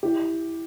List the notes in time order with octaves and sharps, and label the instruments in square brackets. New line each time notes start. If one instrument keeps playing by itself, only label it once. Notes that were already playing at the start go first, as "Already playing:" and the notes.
[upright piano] E4 G4